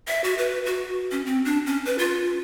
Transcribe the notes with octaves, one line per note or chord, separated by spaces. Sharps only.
E5
F#4
B4
F#4
C#4
C4
D4
C#4
B4
F4